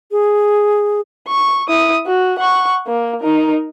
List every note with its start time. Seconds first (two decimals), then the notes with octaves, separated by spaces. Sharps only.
0.11 G#4
1.28 C#6
1.68 E4 D#6
2.06 F#4
2.39 F#5 C#6
2.87 A#3
3.21 D#4 A#4